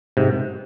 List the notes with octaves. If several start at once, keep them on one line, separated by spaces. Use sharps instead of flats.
G#2 C3